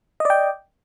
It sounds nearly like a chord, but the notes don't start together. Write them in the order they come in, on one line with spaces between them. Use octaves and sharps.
D#5 D5 G5